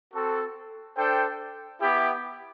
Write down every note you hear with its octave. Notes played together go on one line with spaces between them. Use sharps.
C4 F#4 A4
D4 A4 C5 G5
B3 E4 G4